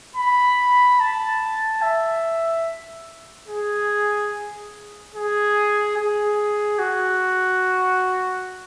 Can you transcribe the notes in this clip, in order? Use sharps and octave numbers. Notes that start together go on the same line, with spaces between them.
B5
A5
E5
G#4
G#4
G#4
F#4